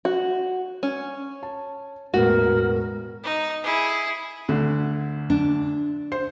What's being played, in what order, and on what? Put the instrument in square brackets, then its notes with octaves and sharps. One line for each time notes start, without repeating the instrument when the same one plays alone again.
[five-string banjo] F#4
C#4
[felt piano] A5
[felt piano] E1 A2 B3 [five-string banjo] F#4 [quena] A#4
[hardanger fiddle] D#4
E4 G#4
[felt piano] D2 D3
[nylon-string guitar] D4
[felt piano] C5